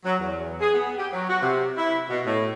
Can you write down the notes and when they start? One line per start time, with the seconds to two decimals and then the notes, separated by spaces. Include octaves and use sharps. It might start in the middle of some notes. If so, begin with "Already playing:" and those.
0.04 F#3
0.20 E2
0.60 G#4
0.74 B3
0.97 G4
1.13 F#3
1.29 F#4
1.42 C3
1.77 E4
2.09 B2
2.26 A2